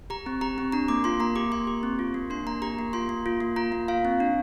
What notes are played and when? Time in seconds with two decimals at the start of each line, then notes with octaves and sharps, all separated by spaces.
0.10 G4 A#5
0.26 C4
0.41 G4 A#5
0.58 C4
0.72 D4 A#5
0.88 A#3 D6
1.04 F4 C6
1.20 A#3 A#5
1.35 G4 D6
1.52 A#3 C6
1.67 G4
1.83 C4
1.99 F4
2.14 A#3
2.30 D4 C6
2.47 A#3 A#5
2.62 G4 A#5
2.79 A#3
2.93 F4 C6
3.09 A#3
3.26 F4
3.40 A#3
3.56 F4 A#5
3.72 A#3
3.88 F4 F5
4.05 C4
4.20 D4